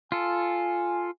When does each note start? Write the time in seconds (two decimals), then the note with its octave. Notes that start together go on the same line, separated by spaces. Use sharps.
0.12 F4 A4 G#5